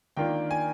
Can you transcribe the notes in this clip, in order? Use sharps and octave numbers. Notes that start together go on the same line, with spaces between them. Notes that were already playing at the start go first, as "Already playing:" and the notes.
D#3 A#3 D4 F4 G5
G#5